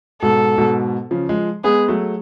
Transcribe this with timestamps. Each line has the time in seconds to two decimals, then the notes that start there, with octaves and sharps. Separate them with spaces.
0.22 G#2 B2 A4
0.58 G#2 B2
1.11 C#3 F3
1.29 F3 G#3
1.64 G#3 B3 G#4
1.88 F#3 A3